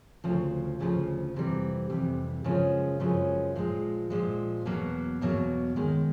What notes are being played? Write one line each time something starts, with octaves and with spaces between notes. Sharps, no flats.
D2 C#3 F3
D2 C#3 F3
F2 C3 E3 G3
F2 C3 E3 G3
F#2 C#3 F3 G#3 C#4
F#2 C#3 F3 G#3 C#4
A#2 F3 G#3
A#2 F3 G#3
E2 B2 F#3 A#3
E2 B2 F#3 A#3
F#2 D#3 G#3